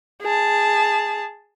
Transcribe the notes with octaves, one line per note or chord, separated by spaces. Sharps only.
G#4 A5